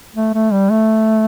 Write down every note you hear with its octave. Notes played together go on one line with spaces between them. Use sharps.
A3
A3
G3
A3